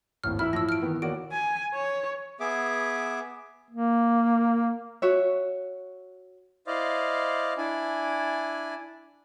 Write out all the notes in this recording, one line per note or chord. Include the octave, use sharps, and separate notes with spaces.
G#1 D#2 A2 F6
E3 E4 B5 E6 F6
A2 F3 E6 A#6
F6 D7
D#3 E3 B3
D#2 A#3 F#4 C#5 D5 D7
G#5
C#5
B3 G#4 E5 D6
A#3
F#4 C#5 E5
E4 C5 D5 D#5 F5
D4 E4 G#5